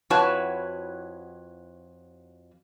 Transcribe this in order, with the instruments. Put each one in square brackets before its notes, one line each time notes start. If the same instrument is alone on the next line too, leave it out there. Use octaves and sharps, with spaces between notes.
[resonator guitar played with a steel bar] F2 E4 F#4 B4 C#5 A5